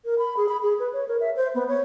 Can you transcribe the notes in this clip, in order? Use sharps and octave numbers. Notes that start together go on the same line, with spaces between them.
A#4
B5
G#4
B5
G#4
B4
C#5
A#4
E5
C5
B3
C#5